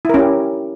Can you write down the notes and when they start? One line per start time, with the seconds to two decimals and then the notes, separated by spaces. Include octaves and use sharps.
0.05 E4
0.09 A#4
0.14 C#4
0.19 G4